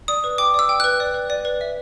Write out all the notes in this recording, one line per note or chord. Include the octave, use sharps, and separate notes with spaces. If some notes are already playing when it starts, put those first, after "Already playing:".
D5 D#6
B4
G5 D6
D5 E6
G5
B4 F#6
D5
B4
D5
B4
E5